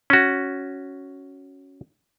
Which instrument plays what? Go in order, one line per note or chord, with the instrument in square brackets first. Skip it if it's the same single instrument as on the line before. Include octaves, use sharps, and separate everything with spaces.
[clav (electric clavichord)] C#4 F#4